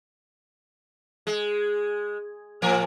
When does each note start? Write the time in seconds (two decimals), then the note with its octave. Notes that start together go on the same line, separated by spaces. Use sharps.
1.27 G#3
2.62 A2 F3 A#4